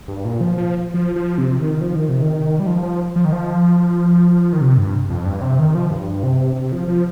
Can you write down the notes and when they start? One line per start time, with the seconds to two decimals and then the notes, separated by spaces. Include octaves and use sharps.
0.08 G2
0.25 A#2
0.41 F3
0.58 F3
0.94 F3
1.16 F3
1.38 C3
1.59 D#3
1.81 F3
1.95 D#3
2.09 C3
2.22 D#3
2.60 G3
2.67 F3
2.83 F3
3.16 F3
3.25 D#3
3.33 F3
4.53 D#3
4.61 C3
4.78 G2
5.10 F2
5.25 G2
5.42 C3
5.59 D#3
5.75 F3
5.91 G2
6.23 C3
6.56 C3
6.72 F3
6.88 F3